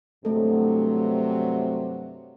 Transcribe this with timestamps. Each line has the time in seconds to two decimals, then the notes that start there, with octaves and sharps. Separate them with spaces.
0.25 G2 C3 F#3 A3 A4